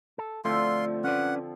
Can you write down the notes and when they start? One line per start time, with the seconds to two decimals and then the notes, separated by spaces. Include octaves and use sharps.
0.18 A4
0.45 D3 F3 A3 C4 F4 C6
1.04 C#4 B4 D5 F#5